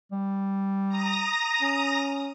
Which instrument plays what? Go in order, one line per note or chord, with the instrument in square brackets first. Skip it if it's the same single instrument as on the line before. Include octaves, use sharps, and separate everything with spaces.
[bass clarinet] G3
[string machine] A#5 D#6 A#6
[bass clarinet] C#4